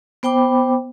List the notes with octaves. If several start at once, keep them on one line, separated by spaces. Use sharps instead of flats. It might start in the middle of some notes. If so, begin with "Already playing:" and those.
B3 C5 G5 B5 D6